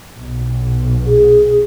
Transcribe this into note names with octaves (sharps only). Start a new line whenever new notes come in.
B1
G#4